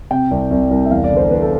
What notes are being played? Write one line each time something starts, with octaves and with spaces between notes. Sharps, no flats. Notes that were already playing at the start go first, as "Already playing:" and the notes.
C3 G5
C2
C2
C2
E5
E2 F5
D5
D3
C5
E2 B4
A4